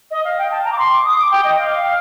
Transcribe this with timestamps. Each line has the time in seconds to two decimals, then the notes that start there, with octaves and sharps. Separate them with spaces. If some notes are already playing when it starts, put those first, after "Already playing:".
0.11 D#5
0.24 F5
0.38 G5
0.51 A5
0.64 A#5
0.72 D6
0.78 C6
0.91 D6
1.04 D#6
1.18 D6
1.31 G5
1.44 D#5
1.58 F5